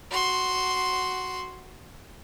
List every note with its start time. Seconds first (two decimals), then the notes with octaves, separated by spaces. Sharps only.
0.11 F#4 C6